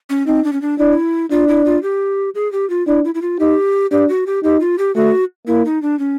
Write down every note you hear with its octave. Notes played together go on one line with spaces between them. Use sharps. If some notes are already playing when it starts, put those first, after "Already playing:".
C#4
C4 D#4
D4
C#4
D4
D4 E4
D4 F4
E4
F4
G4
G#4
G4
F4
D4 E4
E4
E4
F4
D#4 G4
D4 G4
F#4
G4
D#4 G4
F4
G4
A3 F#4
A#3 E4
D#4
D4
C#4